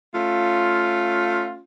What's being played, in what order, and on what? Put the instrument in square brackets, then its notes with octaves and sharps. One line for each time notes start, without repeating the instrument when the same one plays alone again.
[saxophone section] A3 C#4 F4